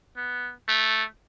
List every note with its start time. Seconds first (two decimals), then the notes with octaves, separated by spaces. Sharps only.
0.17 B3
0.68 A3